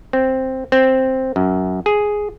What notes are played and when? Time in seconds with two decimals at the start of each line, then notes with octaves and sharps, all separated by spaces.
0.13 C4
0.72 C4
1.36 F#2
1.86 G#4